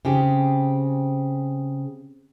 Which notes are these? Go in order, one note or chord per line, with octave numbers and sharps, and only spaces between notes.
C#3 C4 G4 G#4